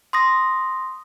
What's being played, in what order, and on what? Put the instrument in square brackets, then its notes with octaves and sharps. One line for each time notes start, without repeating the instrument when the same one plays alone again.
[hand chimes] C6 D#6 A#6